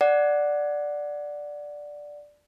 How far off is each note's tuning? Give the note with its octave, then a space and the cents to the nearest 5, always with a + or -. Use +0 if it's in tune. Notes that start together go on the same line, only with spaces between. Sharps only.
D5 +0 F#5 +0